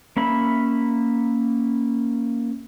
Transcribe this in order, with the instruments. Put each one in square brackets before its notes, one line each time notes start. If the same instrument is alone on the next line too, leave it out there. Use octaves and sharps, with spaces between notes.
[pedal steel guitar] A#3 C#4 E5 B5